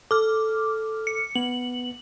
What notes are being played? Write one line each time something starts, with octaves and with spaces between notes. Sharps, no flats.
A4 D6 F6
C#7
B3 F#7